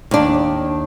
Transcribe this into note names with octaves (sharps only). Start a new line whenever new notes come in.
D#2 D4